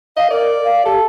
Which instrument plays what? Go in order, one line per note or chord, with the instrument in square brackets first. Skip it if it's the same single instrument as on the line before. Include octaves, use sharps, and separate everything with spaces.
[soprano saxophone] D#5 [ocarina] F5
[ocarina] A#4 [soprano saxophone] D5
[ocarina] F5
[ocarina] G4 [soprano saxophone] A4